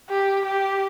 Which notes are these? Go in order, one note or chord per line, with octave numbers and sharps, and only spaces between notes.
G4
G4